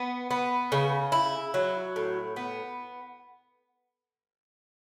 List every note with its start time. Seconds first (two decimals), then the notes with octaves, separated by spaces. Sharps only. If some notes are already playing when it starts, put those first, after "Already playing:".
Already playing: B3
0.31 B3
0.72 C#3
1.12 E4
1.54 F#3
1.96 A2
2.36 B3